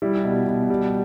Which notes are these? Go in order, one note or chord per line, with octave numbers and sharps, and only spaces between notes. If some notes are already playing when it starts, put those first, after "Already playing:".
G3 E4
B2
B2
G3